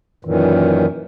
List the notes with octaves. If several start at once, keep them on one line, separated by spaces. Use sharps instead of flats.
F#2 A#2 D#3 E3